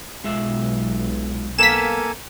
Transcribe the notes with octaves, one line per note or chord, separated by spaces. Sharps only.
B1 G#3 F4 E5
A#3 B3 A4 A#4 F5 G#5 B6 E7